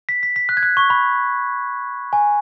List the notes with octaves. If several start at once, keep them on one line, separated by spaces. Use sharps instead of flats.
B6
B6
B6
F#6
G#6
F#6
C#6
B5
G#5